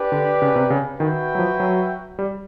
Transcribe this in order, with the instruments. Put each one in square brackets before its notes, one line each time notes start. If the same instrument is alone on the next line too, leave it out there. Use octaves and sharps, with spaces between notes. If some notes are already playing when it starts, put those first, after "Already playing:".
Already playing: [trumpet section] D4 G4 B4
[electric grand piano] D3
C#3
C3
C#3
[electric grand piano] D#3 [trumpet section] F#4 B4 E5 G5
[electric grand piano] F#3
F3
F#3
G3